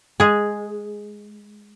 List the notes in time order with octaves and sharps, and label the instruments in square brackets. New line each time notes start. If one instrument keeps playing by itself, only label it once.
[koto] G#3 G#4